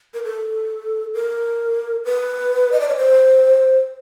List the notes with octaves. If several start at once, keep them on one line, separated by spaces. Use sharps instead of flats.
A#4
A4
A#4
B4
D#5
D5
C#5
C5